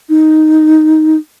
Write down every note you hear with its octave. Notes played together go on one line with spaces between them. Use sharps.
D#4